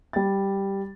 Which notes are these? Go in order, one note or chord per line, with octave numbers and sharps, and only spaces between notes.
G3 A6